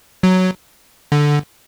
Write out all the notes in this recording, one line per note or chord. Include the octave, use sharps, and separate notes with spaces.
F#3
D3